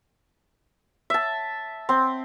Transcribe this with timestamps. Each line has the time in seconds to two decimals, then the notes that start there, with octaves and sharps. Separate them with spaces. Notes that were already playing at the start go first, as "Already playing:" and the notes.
1.10 E5 A5
1.89 C4